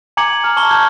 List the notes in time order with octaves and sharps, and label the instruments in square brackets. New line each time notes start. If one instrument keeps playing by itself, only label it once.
[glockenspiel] G#5 A#5 D6 G#6 C#7 F#7
A#5 F6
A5 C#6 G7
A5 F6 G6 G#6